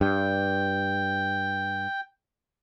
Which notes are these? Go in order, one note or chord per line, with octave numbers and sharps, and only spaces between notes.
G2 G5